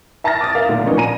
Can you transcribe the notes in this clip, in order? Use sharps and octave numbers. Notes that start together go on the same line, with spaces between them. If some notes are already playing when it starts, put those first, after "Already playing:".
E5 A5 A#5 F6 A6 A#6
D6 D#6 A6
A#4 E5 F5
B1 A#2 D3 A3
F3 A#3 B3 C#4 D#4
A#2 G#5 A#5 D#7